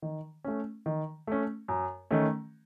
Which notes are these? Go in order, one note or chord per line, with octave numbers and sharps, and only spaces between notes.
D#3
A3 C#4
D#3
A3 C#4
F#2
D#3 A3 C#4